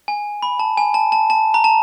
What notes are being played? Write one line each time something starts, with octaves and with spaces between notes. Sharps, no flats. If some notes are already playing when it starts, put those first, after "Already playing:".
G#5
B5
A5
G#5
A5
A5
A5
A#5
A5